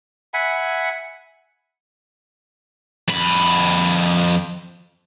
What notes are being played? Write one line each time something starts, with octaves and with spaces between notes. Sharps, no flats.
E5 F#5 G#5 B5
F2 B5